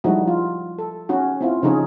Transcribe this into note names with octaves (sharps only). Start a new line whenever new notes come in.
F3 G3 G#3 D#4 E4 F#4
F4
A4
C#4 D#4 F#4
C4 E4 F4
C#3 F3 C#4 D#4 G#4 C#5